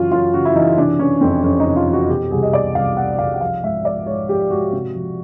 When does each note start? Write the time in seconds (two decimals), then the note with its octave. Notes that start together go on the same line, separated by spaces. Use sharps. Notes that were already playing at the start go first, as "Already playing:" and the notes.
Already playing: F#2 C#3 E3 C#4 F4
0.11 F#2 F4
0.34 C#3 F#4
0.45 E4
0.55 E3 D#4
0.78 C3 D4
0.99 E3 C#4
1.21 F2 C4
1.44 F2 C#4
1.60 D#4
1.66 C3
1.76 F4
1.87 E3
1.93 F#4
2.09 B2 G4
2.31 C2 G#4
2.43 D#5
2.53 B2 D5
2.75 C2 F5
2.97 B2 F#5
3.18 C2 F5
3.34 F#5
3.41 F3 F5
3.63 G#2 E5
3.85 F3 D5
4.06 G#2 C#5
4.29 F3 G4
4.50 G#2 F#4
4.73 C3
4.95 F3